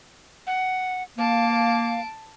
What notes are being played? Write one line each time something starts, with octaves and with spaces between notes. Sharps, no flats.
F#5
A#3 F5 A5 D7